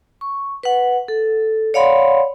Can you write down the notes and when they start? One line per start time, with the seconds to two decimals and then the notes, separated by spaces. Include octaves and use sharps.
0.21 C#6
0.63 B4 F#5
1.08 A4
1.74 C#5 D5 F5 F#5 B5 C6